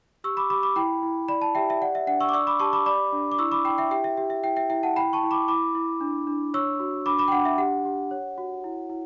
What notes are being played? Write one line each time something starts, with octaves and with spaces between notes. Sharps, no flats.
G4 C#6 E6
B5 D6
G4 B5 D6
B5 D6
E4 G5 B5
E4
D5 B5
A5
G4 E5 G5
E5
D5 F#5
E5
D4 F#5
C#6 E6
D6
D5 C#6 E6
B5 D6
G4 A5 C#6
B5 D6
D5 B5 D6
D4
D6
E4 C#6 E6
B5 D6
E4 G5 B5
E5 G5
G4 E5 G5
E5
G4 E5
E5
E4 E5 G5
E5 G5
E4 E5 G5
F#5 A5
E4 G5 B5
A5 C#6
E4
B5 D6
E4 B5 D6
E4
D4
D4
C#5 C#6 E6
F#4
D4 B5 D6
B5 D6
G5
D4 F#5
E5
G4 F#5
G4
C#5
F#4
E4
E4